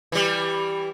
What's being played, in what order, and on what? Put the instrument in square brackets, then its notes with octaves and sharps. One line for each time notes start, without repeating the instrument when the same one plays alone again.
[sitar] E3 G3